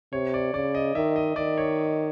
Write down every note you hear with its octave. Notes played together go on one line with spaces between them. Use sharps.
C3 C#5
D5
C#3 D5
D#5
D#3 E5
D#5
D#3 D5
C#5